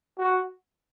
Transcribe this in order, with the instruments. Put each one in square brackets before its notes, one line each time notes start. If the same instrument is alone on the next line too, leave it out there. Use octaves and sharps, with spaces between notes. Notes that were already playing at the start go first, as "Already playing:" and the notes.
[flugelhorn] F#4